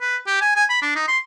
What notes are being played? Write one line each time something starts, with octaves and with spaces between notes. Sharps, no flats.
B4
G4
G#5
G#5
B5
D4
D#4
C6